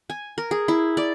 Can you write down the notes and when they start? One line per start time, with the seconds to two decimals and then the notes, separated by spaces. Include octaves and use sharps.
0.10 G#5
0.38 A#4
0.51 G#4
0.68 E4
0.97 D5